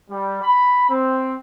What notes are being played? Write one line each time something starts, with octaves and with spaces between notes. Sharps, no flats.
G3
B5
C4